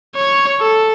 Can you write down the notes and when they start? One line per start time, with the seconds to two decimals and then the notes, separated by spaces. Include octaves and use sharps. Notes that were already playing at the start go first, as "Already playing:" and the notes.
0.16 C#5
0.61 A4